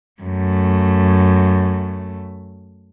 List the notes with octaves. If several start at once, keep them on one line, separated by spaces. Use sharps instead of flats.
F#2 A3